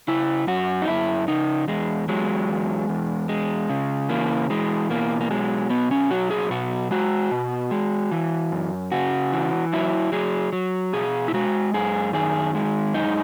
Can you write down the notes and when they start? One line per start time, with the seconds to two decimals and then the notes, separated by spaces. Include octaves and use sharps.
0.08 C#3 E4
0.47 F#2 F#4
0.82 D#4
0.87 F#2 E4
1.28 C#3 D#4
1.68 E2 G#3
2.09 F#3 G#3
2.49 E2
2.89 E2
3.29 G#3
3.70 C#3
4.09 E3 A#3
4.50 E3 G#3
4.90 B2 A#3
5.21 A#3
5.31 F#3 G#3
5.70 B2 B3
5.91 C#4
6.11 F#3 F#4
6.31 G#4
6.50 B2 F#4
6.91 G#3 F#4
7.31 B2
7.71 G#3
8.11 E3
8.52 F#2
8.92 C#3 F#4
9.33 E3
9.73 F#3 E4
10.12 F#3 G#4
10.53 F#3
10.93 B2 G#4
11.28 E4
11.34 G#3 F#4
11.74 F#2 G#4
12.13 D#3 G#4
12.55 G#3
12.94 F#2 D#4